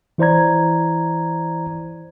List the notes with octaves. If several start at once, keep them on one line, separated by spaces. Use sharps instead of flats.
E3 E4 C5 D5 A#5 G#6